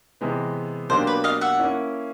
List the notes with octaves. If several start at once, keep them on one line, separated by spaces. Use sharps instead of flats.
C3 E3 G#3 B3
B2 F#3 A#3 D4 G4 C5
B4
D#5 F5
E5 F#5
A#3 C#4 E4